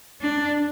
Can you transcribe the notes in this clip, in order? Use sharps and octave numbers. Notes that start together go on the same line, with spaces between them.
D4